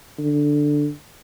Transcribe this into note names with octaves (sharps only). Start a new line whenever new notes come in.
D3